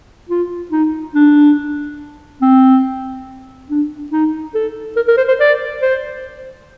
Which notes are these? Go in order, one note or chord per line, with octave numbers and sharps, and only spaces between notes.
F4
D#4
D4
C4
D4
D#4
A4
A#4
A#4
C5
C5
D5
C5